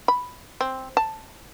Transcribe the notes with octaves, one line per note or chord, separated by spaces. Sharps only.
B5
C4
A5